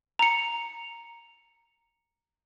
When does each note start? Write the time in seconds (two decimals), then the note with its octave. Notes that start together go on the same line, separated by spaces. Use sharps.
0.19 A#5 C#7